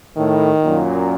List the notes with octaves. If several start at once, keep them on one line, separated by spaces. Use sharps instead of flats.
A2 D#3
F#2 A#2